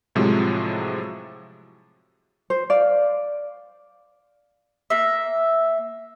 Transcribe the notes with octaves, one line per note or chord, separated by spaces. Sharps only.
A2 C3 F3 F#3 G#3
C5
D5 F5
A#3 E5